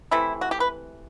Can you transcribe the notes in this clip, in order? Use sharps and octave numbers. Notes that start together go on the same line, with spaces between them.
C3 E3 A3 E4
F#4
G4
B4